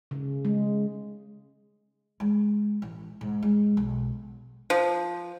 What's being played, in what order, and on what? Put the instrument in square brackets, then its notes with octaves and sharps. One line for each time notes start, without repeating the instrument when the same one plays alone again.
[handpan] C#3
G#3
[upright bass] G#3
A1
G#2
G#3
B1
[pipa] F3